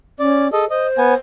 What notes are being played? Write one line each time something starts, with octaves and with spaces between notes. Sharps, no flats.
C#4 D5
G#4 A4 D#5
C5 D#5
B3 G#5